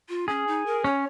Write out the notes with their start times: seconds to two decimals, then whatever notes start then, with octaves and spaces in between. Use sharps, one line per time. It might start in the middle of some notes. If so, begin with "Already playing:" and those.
0.09 F4
0.28 C#4 G#4
0.47 D#4
0.66 A#4
0.84 C#4 C#5